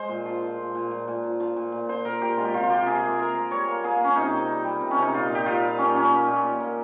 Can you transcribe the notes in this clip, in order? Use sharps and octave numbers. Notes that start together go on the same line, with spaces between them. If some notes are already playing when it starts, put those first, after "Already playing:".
Already playing: G#3 C5
A#2
F3
F3
A#2
A#2
A#2
A#2
F3
F3
A#2
A#2
F3 C5
A#2 A#4
A#2 G4
G#3 F4
G4
C3 F4
A#3 G4
C3 G#4
A#3
A#3 A#4
A#3
G3 C#5
A#3
A#3 G#4
A#3 C#4
C3 D#4
C3
G3
G3
C3
C#4
C3 D#4
A#2 F4
A#2
G4
A#2 F4
G3
A#3 C#4
A#2 C#4
A#3
A#2
A#2
A#3